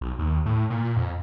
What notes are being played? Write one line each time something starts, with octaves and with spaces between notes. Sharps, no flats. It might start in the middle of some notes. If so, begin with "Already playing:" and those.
B1
D#2
A2
A#2
F2